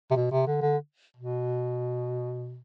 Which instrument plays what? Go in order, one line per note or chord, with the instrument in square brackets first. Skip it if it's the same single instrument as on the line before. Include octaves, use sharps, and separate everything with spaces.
[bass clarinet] C3
B2
C3
D3
D3
B2